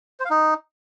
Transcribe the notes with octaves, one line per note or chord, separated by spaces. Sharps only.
C5
F5
D#4